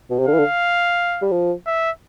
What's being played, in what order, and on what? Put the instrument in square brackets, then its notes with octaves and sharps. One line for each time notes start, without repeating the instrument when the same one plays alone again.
[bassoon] B2
C3
[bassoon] D3 [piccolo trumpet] F5
[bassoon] E3
D3
G3
F3
[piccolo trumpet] E5